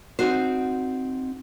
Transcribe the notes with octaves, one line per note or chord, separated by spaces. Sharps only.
C4 D#4 F#4 C5